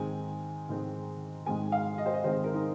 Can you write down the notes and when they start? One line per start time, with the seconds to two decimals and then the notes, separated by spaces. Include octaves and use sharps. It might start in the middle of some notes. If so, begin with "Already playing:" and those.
Already playing: G#2 D#3 G#3 C4 G#5
0.69 G#2 D#3 G#3 C4
1.46 G#2 D#3 G#3 C4 G#5
1.72 F5
1.98 D#5
2.06 C5
2.14 D#5
2.24 G#2 D#3 G#3 C4 C5
2.44 A#4
2.54 D#4